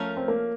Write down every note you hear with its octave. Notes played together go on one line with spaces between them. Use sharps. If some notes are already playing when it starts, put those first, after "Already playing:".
Already playing: F3 A3 C#4 F4 A#4
C4
A#3